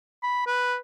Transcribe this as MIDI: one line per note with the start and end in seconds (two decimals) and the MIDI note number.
0.23 0.44 83
0.46 0.76 71